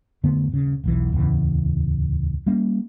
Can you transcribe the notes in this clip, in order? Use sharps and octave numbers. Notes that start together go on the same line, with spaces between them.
F2 D3 A3 B3
D#1 C#3
E1 B1 E3
D1 E2 C#3 E3
G3 A#3 C#4